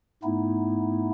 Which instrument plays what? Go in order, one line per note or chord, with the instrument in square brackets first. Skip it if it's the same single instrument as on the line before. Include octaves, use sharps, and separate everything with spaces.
[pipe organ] G#2 A3 B3 D#4 E4